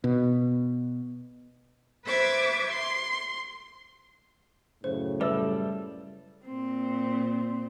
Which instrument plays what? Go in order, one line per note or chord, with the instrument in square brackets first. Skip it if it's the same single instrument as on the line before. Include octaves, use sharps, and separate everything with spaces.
[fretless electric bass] B2
[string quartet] B4 C5 E5 D6 G#6 A6
C6
[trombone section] F#2 A2 C#3 [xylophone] C5
[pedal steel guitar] G3 A4 E6 [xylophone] B4 D5 E5
[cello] A#2 C4